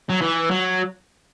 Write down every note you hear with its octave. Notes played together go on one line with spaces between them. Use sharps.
F#3
E3
F#3